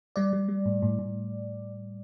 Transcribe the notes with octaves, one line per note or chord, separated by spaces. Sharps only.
G3 D5
G3
G3
A2
A2
A2